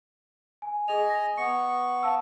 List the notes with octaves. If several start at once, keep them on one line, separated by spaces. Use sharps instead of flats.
G#5
G#4 D#5 G#5 F7
A#6
B3 C#6 C#7
F5 A5 E6